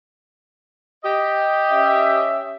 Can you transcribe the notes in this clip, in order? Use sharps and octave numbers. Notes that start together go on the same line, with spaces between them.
G4 D#5
C#4 E5